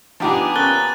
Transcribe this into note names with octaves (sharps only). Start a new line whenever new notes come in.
F3 B3 D4 D#4 G4 G#4 F#5 D6
A#2 C#4 A#4 F#6 A6 G7